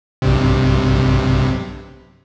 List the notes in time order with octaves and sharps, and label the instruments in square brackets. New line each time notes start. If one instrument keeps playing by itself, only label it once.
[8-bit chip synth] B1 G2 C3